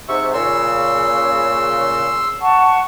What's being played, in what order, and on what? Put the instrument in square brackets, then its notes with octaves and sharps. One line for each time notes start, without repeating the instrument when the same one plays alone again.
[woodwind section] G#2 C3 [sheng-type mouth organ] E5 C#6
[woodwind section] A#2 C#3 [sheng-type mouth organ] C6 E6
[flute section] F#5 A5 C#6